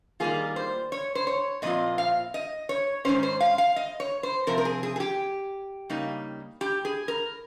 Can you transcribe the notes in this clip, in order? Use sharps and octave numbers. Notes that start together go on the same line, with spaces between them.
D#3 G3 A#3 F4 G#4
C5
C#5
C5
C#5
A#2 F3 C4 F4 D#5
F5
D#5
C#5
G#2 D#3 G#3 C#4 C5
C5
F5
F5
D#5
C#5
C5
C3 F3 C4 A#4
A#4
G#4
G#4
G#4
G4
C#3 G3 A#3 D#4
G4
G#4
A#4